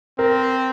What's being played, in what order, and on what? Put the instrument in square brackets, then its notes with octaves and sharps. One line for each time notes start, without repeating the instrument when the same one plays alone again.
[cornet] C4 [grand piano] A#4